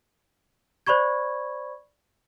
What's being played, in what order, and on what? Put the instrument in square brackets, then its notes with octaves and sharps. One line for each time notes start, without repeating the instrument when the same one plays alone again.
[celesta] C5 D5 B5 C#6 G#6